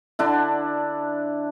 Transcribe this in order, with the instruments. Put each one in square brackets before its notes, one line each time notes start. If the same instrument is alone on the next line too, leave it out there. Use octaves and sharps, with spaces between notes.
[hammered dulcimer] D3 D4 E4